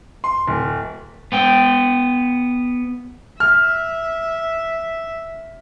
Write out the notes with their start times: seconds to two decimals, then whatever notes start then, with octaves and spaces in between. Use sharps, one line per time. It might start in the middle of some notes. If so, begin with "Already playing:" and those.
0.24 C6
0.48 D1
1.32 B3 G5
3.40 E5 F6